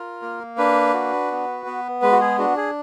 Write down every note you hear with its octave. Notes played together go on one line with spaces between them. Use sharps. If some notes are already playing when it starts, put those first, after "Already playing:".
Already playing: F4 A#4
A#3
D4 B4
F#4
B3
B3
G#3 B4
F#4
G#4
D4 F#4
G#4